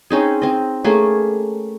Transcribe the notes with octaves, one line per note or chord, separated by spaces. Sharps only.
C4 C#4 D#4 G#4
C4 D#5
A3 A#3 C#4 G#4